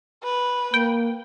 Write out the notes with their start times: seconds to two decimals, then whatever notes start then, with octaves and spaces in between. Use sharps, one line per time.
0.23 B4
0.74 A#3 G5